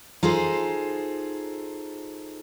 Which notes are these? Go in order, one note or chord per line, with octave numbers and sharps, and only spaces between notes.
D#4 F4 G#4 A4 C5